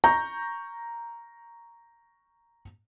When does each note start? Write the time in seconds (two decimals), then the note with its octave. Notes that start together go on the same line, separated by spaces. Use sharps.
0.04 A#5 C#6 G6 A#6